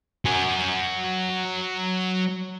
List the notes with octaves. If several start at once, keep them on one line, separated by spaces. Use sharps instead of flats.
F#3 G#5